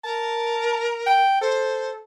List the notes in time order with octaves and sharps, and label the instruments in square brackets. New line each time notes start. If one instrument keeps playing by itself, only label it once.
[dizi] A#4 [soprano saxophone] A5
[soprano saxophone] G5
[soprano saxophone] A4 [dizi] C5